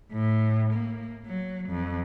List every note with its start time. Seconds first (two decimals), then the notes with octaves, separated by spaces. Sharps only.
0.12 A2
0.73 A#3
1.26 F#3
1.69 F2